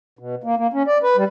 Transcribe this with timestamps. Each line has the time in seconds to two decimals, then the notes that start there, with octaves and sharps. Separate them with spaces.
0.19 B2
0.44 A#3
0.57 A#3
0.73 C#4
0.87 D5
1.03 B4
1.17 G3